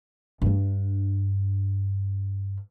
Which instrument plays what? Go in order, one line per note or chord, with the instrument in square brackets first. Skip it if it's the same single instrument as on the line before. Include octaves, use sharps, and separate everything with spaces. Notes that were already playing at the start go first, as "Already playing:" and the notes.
[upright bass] G2 D4